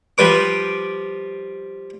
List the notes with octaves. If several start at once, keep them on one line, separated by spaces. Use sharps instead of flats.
F3 G3 B4 D6